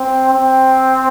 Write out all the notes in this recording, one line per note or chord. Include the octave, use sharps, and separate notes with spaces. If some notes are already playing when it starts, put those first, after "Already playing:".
Already playing: C4
C4